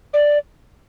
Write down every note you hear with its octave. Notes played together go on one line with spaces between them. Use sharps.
D5